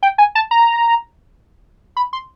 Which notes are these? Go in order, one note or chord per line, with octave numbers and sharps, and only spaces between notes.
G5
G#5
A5
A#5
B5
C6